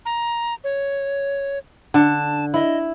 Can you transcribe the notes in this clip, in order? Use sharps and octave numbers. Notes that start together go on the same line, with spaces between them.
A#5
C#5
D3 A5
E4 D#5